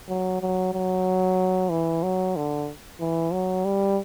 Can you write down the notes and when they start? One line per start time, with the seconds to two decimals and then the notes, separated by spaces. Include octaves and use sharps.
0.09 F#3
0.41 F#3
0.74 F#3
1.70 E3
2.03 F#3
2.36 D3
3.00 E3
3.33 F#3
3.65 G3